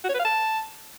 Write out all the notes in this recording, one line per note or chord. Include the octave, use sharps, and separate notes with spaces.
F#4
C#5
B4
F5
A5